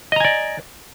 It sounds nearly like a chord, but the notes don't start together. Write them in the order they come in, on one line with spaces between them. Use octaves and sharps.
D#5 A#5 G#5 D5